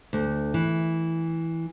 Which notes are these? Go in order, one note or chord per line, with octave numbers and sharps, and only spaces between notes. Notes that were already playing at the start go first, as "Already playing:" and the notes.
D2
E3